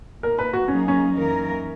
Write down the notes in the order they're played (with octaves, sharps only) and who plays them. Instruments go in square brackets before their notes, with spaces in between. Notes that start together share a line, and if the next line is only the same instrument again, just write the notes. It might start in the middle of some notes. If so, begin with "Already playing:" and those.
[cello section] A#2 A#3 D#4 [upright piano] A#4
[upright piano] B4
F#4
[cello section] F#3 A#3 D#4 G#4 [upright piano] C#4
[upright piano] C#4
[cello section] F#2 E3 A#3 D#4 A#4